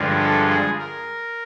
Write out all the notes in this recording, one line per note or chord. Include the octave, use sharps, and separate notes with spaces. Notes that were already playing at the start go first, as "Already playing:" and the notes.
Already playing: G2 D3 F3 G#3
A4
G#4
A#4